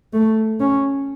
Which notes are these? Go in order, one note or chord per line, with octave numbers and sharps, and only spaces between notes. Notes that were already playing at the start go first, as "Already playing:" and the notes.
A3
C#4